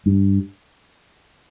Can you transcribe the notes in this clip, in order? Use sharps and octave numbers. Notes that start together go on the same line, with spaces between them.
G2